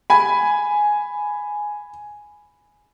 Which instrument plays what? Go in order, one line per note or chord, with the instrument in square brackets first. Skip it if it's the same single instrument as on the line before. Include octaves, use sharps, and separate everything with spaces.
[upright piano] G#5 B5